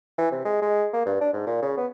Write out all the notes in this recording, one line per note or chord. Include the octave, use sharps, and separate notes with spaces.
E3
C3
G#3
G#3
A#3
G2
D4
G#2
A#2
C#3
B3